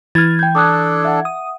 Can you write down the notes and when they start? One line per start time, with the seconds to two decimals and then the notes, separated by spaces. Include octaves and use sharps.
0.15 E3 F6 G#6 A6
0.39 G5 G6
0.55 D4 A4 D6 D#6 F#6
1.05 E5 F#5
1.25 D#6